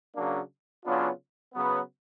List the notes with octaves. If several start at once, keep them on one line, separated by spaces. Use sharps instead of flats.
C#3 F#3 A#3 D4
C#3 F#3 B3 D4 F4
C#3 F#3 B3